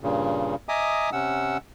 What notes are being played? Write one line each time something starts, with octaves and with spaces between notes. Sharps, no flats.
G2 A#2 C#3
D#5 E5 G#5 A#5 D6 D#6
C3 C#4 F#5 E6